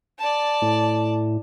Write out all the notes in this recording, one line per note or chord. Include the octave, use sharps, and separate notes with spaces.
D5 A5
A2